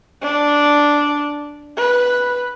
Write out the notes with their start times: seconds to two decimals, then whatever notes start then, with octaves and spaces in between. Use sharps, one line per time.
0.22 D4
1.77 B4